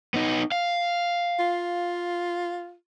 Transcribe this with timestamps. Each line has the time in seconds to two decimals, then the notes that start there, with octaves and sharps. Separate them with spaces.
0.14 B3 D#4
0.52 F5
1.39 F4